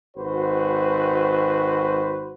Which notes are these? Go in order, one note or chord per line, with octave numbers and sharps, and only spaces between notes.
G#1 F#4 B4 C5